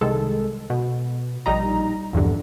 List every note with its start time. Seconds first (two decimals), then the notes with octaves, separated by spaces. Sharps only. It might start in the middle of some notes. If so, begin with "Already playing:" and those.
0.01 C2 D#3 G#3 A4
0.70 B2
1.46 A#1 G3 D#4 A#5
2.13 A#1 E2 G2 D3